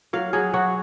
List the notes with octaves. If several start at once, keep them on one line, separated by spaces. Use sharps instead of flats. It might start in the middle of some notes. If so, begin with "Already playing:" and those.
F#3 F5
F#3 G#4
F#3 F#4